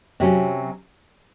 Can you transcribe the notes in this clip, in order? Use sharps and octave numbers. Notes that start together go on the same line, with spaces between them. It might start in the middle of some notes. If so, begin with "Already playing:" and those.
C3 F#3 C#4